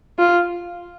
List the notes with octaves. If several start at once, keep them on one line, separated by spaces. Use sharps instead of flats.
F4